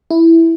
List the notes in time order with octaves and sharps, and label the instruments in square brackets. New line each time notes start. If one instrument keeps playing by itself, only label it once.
[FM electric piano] E4